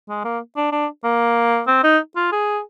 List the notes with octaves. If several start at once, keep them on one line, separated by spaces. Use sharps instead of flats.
G#3
A#3
D4
D4
A#3
C4
D#4
F4
G#4